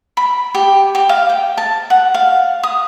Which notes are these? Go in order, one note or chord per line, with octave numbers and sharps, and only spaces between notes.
B5
G4
G4
F5
G5
A5
F#5
F5
D#6